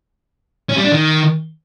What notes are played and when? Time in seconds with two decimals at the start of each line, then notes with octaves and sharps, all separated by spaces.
0.69 C#4
0.77 G3
0.84 D4
0.92 D#3